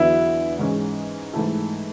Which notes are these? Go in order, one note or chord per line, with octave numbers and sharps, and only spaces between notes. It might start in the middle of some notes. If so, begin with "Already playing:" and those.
Already playing: E2 D3 F#3 B3 E4
G#2 E3 G#3 C#4
G#2 E3 A3 E4 A4